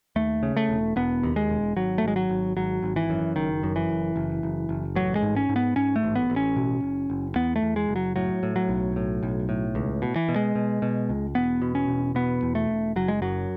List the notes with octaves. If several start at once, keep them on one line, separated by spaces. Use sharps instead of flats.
D#2 A3
C#3
A3
E1
E1 B3
D#2
G#3
E1
G#1 F#3
A3
G#1
G#3
F#3
G#1
G#1 F#3
G#1
E3
F#2
F#1 D#3
F#2
E3
F#1
F#1
F#1
F#1
A1 F#3
G#3
G#2
C#4
G#2
B3
G#2 C#4
A3
A1
B3
A1
C#4
B2
F#1
F#1
E2 B3
A3
E2
G#3
F#1
F#3
A2 F#3
A2
F#3
B1
A2
B1
A2
C#2
B2
E3
B2
G#3
B2
B2
C#2
E1 B3
B2
C#4
E1
B2 B3
E2
A3
E1
F#1 F#3
G#3
F#2 F#3